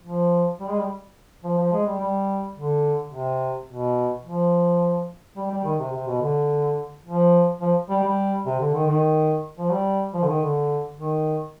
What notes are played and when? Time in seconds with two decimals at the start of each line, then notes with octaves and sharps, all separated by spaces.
0.04 F3
0.60 G3
0.69 G#3
0.78 G3
1.44 F3
1.58 F3
1.72 G#3
1.86 G3
2.00 G3
2.56 D3
3.12 C3
3.69 B2
4.25 F3
5.37 G3
5.51 G3
5.65 D#3
5.80 C3
5.93 C3
6.07 B2
6.21 D3
7.06 F3
7.61 F3
7.89 G3
8.03 G3
8.46 C3
8.60 D3
8.74 D#3
8.87 D#3
9.58 F3
9.71 G3
10.14 F3
10.23 D3
10.28 D#3
10.42 D3
10.98 D#3